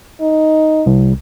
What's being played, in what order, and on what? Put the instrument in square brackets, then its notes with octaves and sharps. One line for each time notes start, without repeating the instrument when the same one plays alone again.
[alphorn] D#4
[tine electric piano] C2